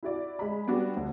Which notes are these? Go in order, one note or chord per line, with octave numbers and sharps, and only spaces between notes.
E4 F#4 D5
G#3 B5
G3 B3 D4 F#4
D2